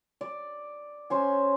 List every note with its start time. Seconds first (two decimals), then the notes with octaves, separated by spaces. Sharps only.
0.21 D5
1.10 C#4 C5 G#5